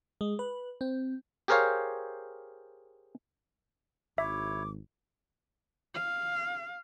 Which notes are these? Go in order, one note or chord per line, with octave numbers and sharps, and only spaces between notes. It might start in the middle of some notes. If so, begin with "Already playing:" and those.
G#3
B4
C4
G4 G#4 A#4 C5 C#5 F5
G#1 E4 C#5 E5 D6
F5